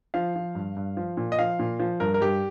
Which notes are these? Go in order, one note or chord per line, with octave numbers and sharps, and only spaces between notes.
F3 F5
F3
G2
G2
F3
A#2
D#5
F3 F5
A#2
F3
G2 A#4
A#4
G2 G4